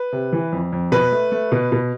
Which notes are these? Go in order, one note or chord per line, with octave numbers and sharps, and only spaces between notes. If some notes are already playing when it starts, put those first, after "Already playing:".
Already playing: B4
C3
E3
F2
F2
B2 B4
A3
A3
B2
B2